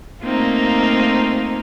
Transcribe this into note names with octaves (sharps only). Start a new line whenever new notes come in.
A3 A#3 C4 D#4 F4